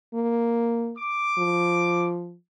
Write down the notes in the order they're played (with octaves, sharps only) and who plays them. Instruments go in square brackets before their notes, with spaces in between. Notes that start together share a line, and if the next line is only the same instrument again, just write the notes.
[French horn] A#3
[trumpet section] D6
[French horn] F3